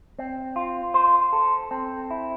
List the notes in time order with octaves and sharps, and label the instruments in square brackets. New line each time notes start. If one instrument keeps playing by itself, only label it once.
[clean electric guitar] C4
F4
C5
A4
C4
E4